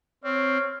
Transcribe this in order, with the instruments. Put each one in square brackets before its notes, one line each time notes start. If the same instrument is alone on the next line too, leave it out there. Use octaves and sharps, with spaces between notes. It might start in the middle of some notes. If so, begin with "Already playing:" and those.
[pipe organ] C4 [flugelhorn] C#5 [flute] F6